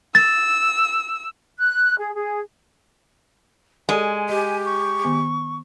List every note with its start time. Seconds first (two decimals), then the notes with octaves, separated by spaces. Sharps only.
0.15 E6 A6
1.60 F#6
1.99 G#4
2.15 G#4
3.89 G#3 G4 A4 D5 G#5
4.29 G4 D#5
4.66 C#6
5.04 D#3 B3